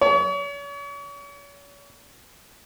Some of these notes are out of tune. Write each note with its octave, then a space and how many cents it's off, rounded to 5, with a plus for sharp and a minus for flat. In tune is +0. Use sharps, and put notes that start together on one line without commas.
C#5 +40